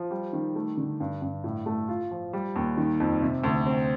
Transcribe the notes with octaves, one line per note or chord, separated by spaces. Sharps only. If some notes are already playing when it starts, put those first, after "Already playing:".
Already playing: F3
G3
D#3
A3
D3
G2
G2
A2
A3
F4
F3
G3
D#2
D#3
F2
C3
D2
C4